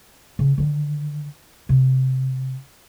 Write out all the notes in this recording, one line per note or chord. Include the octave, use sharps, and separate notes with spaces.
C#3
D3 D#3
C3